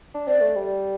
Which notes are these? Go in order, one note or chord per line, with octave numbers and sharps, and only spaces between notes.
D4
C4 D5
A3
G3